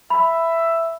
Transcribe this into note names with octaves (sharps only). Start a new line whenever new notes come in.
E5 B5